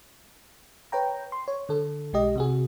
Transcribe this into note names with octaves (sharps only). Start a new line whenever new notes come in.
B4 C#5 G5 A#5
C6
C#5
D3 A4
B1 G#3 G4 D#5
C3 F#4 G#4